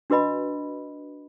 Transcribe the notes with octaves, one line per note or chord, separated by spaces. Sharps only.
D4 F#4 B4 D#5 B5